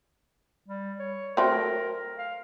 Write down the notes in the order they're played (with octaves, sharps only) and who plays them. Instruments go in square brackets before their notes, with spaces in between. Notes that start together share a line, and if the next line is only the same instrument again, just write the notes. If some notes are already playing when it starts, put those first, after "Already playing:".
[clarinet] G3
C#5
[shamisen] F#3 A3 C4 [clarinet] A#4
[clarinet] F5